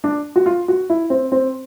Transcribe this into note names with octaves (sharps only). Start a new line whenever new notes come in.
D4
F#4
F4
F#4
E4
C4
C4